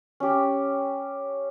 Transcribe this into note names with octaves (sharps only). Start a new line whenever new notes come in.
C#4 G4